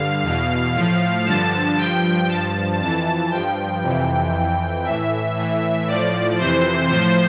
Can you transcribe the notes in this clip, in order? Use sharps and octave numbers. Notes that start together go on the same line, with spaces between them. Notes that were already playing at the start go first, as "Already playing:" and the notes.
Already playing: G2 D3 F5
E2 B2
A2 F3
G2 D3 F3 A5
G2 F3 G5
G2 F3 A5
F2 E3 A5
G2 F3 G5
F2 C3 E3
F2 E3
A2 E3 E5
A2 E3
A2 F3 D5
F2 C3 E3 C5
A2 F3 C5